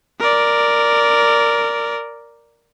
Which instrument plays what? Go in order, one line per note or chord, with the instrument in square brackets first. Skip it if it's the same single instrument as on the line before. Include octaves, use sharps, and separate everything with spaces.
[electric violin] A#4 D5